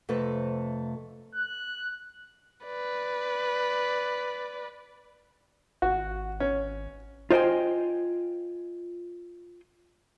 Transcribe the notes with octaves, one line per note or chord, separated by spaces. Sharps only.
F2 C3 A3 A4 B4
F#6
B4 D5
G#1 F#4
C#4
F4 C5 D#5 G5 G#5